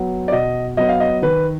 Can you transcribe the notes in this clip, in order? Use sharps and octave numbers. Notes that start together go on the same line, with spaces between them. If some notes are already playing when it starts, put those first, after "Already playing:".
Already playing: F#3 B3
D5
B2 D#5
F#3 B3 D#5
F5
D#5
D#3 B4